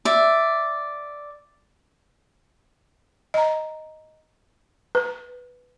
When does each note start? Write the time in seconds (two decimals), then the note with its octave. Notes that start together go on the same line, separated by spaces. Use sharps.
0.05 D5 E5
3.34 D#5 A#5
4.95 B4